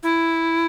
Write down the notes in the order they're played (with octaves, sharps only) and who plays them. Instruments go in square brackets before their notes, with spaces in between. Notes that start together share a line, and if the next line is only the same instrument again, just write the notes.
[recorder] E4